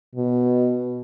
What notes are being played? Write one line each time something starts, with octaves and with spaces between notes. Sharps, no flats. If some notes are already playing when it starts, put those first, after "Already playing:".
B2